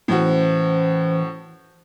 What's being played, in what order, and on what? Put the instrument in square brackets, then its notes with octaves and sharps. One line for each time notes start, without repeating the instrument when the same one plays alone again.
[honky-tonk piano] A2 F#4 [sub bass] E3 [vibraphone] C#4 C5